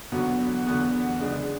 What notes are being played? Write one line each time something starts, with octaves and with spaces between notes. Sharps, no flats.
E2 D3 F#3 B3 F#4
E2 D3 F#3 B3 F#4
C#3 G#3 D4 G#4